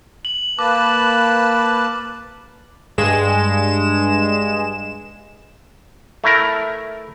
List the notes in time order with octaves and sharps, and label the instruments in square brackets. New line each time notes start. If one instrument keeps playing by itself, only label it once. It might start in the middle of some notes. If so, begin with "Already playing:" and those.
[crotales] F#7
[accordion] A#3 B4 A5 [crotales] D6
[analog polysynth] G2 G#3 E7
[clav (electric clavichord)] A3 E4 A#4